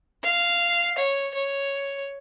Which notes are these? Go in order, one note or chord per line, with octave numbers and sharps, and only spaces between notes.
F5
C#5
C#5